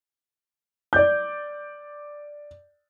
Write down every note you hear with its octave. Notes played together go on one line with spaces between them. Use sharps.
D5 G6